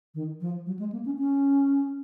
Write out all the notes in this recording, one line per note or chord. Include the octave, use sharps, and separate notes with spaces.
D#3
F3
F#3
G#3
A#3
C#4
C#4